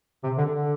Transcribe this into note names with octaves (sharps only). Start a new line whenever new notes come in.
C3
D3
D3